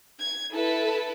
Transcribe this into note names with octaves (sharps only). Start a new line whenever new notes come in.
G#6
E4 A4 B4